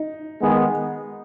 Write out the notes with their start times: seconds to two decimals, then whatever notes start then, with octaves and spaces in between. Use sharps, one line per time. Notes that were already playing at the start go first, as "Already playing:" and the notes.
Already playing: D#4
0.41 D#3 G#3 B3 G#4